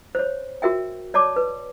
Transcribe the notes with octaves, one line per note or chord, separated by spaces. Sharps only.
C5 C#5
F#4 A#4 E5 G5
C#5 D5 A5 D6
B4